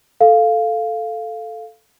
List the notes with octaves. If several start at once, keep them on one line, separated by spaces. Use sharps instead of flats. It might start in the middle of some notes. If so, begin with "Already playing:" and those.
A4 F5